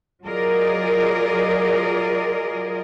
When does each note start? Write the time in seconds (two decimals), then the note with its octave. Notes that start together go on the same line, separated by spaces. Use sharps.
0.25 F#3 F4 G#4 A#4 D5 D#5